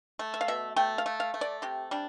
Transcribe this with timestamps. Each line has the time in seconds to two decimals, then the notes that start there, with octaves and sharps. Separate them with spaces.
0.19 A3
0.34 E5
0.41 F5
0.48 B2 E5
0.76 A3 G5
0.98 F5
1.06 A3
1.20 F5
1.34 A3
1.41 D5
1.62 C3 G4
1.91 G3 D4